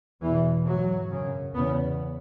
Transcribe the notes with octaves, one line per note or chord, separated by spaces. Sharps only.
E2 B2 E3
G#2 F#3
F#2 C#3
E2 C#3 B3